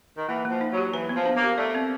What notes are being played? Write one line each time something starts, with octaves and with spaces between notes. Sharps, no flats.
D#3
E3 A#3
F3 A#3
D#4
F#3
G4
E3 B4
B3
F3
D4
A#3
G4
A3 D5
C4